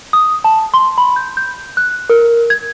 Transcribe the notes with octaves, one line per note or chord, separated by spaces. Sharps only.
D#6
A5
C6
B5
G6
G6
F#6
A#4
G#6